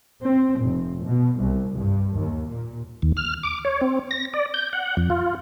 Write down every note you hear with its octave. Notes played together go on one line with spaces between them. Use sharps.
C4
F1
B2
C2
G2
D#2
A#2
D#2
F6
D6
C#5
C4
A#6
D5
G6
F#5
F2
F4